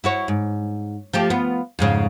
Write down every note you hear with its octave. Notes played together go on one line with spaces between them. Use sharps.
E4 F#4 C#5
G#2
F3 A3 G4
B3 F4
F2 G#2 C#3